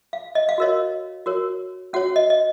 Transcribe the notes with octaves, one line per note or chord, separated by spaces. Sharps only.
F5
D#5
F5
F#4 A#4 C#5 D#5
F#4 A#4 C#5
C#4 F#4 C#5 F#5
D#5
D#5